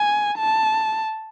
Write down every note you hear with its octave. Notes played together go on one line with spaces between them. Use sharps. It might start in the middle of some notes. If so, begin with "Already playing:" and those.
Already playing: G#5
A5